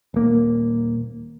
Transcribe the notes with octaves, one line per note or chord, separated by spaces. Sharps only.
D#1 A#3